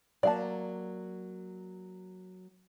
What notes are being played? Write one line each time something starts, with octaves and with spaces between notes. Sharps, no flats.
F#3 A#3 D5 F5 A5